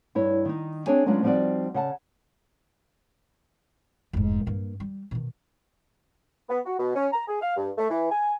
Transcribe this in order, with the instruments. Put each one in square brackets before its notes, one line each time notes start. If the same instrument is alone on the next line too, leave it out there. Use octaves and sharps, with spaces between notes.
[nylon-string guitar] G2 E4 C#5
D#3 D#4
C4 D4 G#4 C#5 G#5
F#3 G#3 B3 C#4 D4 F4
F3 G3 C4 D#4 F#4 D5
C#3 F#5 A5
[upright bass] F1 G#2
G2 A#3
G3
B2 D#3
[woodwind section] B3
F#4
B2
C#4
A#5
G#4
F5
G2
A3
E3
G#5